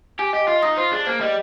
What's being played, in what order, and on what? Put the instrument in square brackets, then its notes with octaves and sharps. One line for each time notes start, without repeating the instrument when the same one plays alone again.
[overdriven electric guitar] G4 [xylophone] G#5
[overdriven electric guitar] G4 [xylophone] D#5
[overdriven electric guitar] F4 [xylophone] D#5
[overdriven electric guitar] D#4 [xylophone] D#6
[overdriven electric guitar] F4 [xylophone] C5
[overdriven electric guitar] D4 [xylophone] G#4
[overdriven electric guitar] A#3 [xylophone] C5
[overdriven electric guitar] G3 [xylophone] D#5